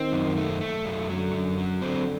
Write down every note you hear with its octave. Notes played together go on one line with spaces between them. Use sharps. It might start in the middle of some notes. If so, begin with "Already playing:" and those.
Already playing: D#3 C4
F#2
A3
A3
F#2
D3 F#3
F#2
F#3
D3 C4